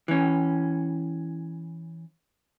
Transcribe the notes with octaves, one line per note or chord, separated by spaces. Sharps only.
E3 C#4